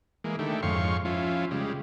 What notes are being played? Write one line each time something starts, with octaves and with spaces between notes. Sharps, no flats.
E3 G#3 A#3
D3 D#3 A3 E4 G4
F2 G#2 C#5 F5 C6 C#6
F3 C#4 E4 F4
C#3 G3 G#3